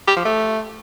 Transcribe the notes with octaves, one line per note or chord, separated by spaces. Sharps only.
G4
F3
A3